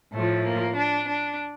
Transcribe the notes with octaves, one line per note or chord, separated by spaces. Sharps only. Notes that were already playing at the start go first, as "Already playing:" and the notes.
A2 F3 A3
A#3
D4
D4